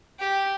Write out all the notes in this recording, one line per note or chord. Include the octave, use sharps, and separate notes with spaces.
G4